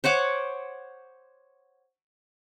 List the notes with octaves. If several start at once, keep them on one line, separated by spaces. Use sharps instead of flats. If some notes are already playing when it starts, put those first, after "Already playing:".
C5 C#5 F#5 D6